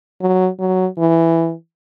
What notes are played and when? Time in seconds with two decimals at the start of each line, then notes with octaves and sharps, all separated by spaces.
0.21 F#3
0.59 F#3
0.98 E3